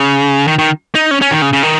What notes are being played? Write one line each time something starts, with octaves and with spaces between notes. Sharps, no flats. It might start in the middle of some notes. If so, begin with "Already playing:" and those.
Already playing: C#3
D#3
D#3
D#4
C#4
C#4
D#3
C#3
C#3
D#3